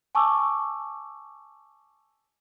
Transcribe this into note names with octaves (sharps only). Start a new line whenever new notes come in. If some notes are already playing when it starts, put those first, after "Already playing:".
G#5 A5 C#6 D6 E6